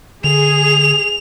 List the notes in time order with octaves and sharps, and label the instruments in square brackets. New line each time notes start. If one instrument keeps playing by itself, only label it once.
[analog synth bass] D3 [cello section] G#4 [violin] F7